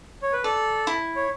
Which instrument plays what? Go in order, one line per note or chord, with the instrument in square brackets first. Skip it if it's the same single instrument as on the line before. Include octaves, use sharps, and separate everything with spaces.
[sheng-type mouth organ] C#5
B4
[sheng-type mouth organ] A4 [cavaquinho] D5
[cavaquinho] E4
[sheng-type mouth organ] C#5